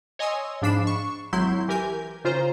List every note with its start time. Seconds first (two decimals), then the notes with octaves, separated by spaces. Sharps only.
0.19 C#5 D#5 G#5 C6 D#6 E6
0.62 G#2 F3 D4 B5 C7 E7
0.87 C#6
1.33 G#1 F#3 E4 C6 G6
1.68 E3 G4 A#4 G#5 G6
2.24 C#3 F4 C5 A#5